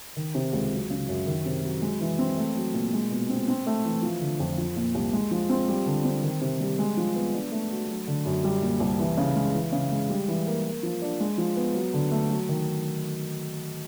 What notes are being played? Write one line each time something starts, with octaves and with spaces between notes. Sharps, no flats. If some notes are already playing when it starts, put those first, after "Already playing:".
D#3
C3
C#2
F#3
C#3
F#2
D#3
C3
F#3
G#3
E3
C4
A3
F#3
A#2
G#3
B2
C4
C4
A3
E3
F3
D3
F2
F3
A#2
C2
G#3
F3
C4
G3
D3
C4
D#3
C3
G3
G#3
F3
B3
D4
A3
F#4
F#3
D3
F#2
G3
A#2
C2
E3
C#3
G#3
E3
C#3
G#3
G3
E3
A#3
A#3
F3
D4
G#3
F3
B3
F#3
D3
A3
F#3
D#3